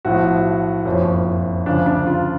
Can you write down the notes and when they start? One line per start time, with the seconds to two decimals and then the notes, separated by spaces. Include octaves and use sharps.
0.05 B1 A2 F3 F#4
0.85 F#1 F2 F3 C#4
1.66 D2 C#3 F3 D4
1.86 D4
2.06 F4